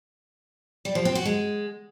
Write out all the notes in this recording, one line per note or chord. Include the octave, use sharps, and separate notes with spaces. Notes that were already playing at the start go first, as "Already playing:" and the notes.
G3
F3
C4
F#4
G#3